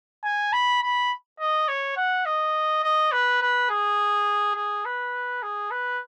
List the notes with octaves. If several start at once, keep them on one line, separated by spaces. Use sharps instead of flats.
G#5
B5
B5
D#5
C#5
F#5
D#5
D#5
B4
B4
G#4
G#4
B4
G#4
B4